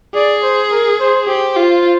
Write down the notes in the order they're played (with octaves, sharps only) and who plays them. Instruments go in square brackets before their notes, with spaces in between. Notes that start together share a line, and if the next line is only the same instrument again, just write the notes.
[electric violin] G#4 [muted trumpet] D5
[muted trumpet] C5
A#4
C5
[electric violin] G4 [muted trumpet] C5
[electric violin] F4